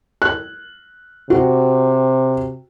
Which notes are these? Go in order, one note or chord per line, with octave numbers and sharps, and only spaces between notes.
F#6
C3 F#4